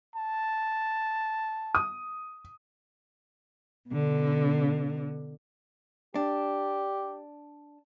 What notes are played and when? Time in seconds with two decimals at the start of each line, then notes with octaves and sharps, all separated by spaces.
0.16 A5
1.75 D#6
3.90 B2 D3
6.15 D4 G4